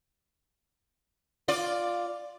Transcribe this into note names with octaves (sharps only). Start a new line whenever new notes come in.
F4 D5